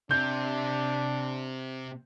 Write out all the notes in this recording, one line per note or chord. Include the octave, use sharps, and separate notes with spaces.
C3 D4 G6